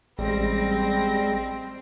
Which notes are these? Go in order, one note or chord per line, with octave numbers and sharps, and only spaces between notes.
A1 G3 G#3 C4 A#6